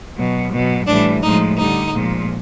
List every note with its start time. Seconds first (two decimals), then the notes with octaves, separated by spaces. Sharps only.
0.15 B2 F#3
0.51 B2 F#3
0.86 A2 E3 G3 D4
1.22 A2 F3 G#3 D#4
1.58 D3 G3 D#4
1.93 A#2 F3 G#3